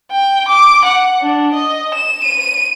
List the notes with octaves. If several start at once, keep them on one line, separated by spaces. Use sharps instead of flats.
G5
D6
F#5
D4
D#5
E7
D#7